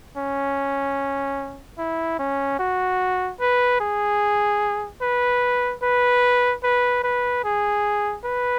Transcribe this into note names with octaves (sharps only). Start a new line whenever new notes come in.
C#4
E4
C#4
F#4
B4
G#4
B4
B4
B4
B4
G#4
B4